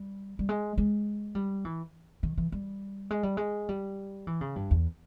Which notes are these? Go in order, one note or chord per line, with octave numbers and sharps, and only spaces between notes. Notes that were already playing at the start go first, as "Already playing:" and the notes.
Already playing: G3
G3
G#3
G#3
G3
E3
D#3
E3
G3
G#3
G3
G#3
G3
E3
C#3
G2
E2